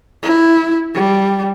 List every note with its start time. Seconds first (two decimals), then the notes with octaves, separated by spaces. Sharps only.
0.23 E4
0.94 G3